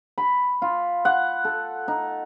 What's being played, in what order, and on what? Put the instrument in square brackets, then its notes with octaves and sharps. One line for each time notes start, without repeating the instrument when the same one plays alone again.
[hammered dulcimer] B5
F4
F#5
A4
D#4